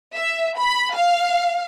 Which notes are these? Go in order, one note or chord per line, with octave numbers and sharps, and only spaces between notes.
E5
B5
F5